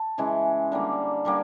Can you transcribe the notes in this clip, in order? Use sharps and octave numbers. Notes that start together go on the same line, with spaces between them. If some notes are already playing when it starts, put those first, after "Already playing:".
Already playing: A5
C#3 E3 G#3
D3 G3 A#3
D3 G3 A#3